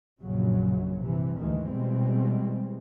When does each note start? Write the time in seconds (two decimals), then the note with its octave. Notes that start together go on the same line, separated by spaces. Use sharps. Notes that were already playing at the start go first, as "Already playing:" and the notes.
0.22 A#1 F#2 A#2 C#3 F#3
1.01 G2 C3 E3
1.38 D2 G2 D#3 E3 G#3
1.71 B2 E3 G3 G#3 C4